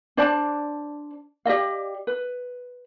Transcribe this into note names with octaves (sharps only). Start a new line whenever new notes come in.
D4 C5 D5 A5
G4 D5 D#5 F5
B4